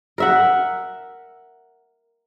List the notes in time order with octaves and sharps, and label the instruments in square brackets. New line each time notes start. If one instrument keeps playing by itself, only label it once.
[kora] A#4 E5 F#5